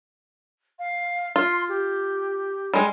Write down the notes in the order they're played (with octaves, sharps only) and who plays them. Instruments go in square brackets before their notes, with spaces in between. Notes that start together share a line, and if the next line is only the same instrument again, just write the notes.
[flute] F5
[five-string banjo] F4 [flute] C6
[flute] G4
[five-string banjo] G3 G#3